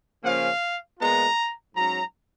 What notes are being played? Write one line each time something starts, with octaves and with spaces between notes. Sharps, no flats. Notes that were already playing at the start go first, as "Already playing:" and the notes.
C#3 F3 A#3 C#4 F5
A#2 G#3 B3 F4 A#5
G#2 F#3 C#4 A#5